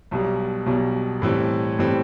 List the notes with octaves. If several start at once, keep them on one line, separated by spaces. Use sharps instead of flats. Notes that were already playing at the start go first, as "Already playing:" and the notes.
B1 B2 G3
B1 B2 G3
A2 E3 G3 C4
A2 E3 G3 C4